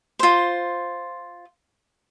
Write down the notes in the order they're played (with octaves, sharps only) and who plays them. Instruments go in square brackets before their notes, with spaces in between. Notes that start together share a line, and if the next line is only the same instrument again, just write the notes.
[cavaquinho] F4 C5